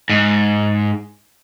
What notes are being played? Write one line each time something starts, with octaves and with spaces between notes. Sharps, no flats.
G#2